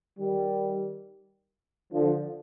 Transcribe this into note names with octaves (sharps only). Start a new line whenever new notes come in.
D#3 G3
D3 F3